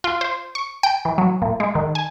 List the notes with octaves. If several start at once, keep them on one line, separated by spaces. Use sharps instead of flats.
F4
C5
C#6
G5
E3
F#3
A#2
G#3
D#3
G#5